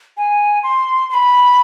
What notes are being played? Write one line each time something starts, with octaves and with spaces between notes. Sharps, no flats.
G#5
C6
C6
B5